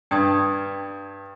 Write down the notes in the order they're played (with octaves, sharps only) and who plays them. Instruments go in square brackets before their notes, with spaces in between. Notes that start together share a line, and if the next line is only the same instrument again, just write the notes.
[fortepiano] G2 [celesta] G5 D#6 G#6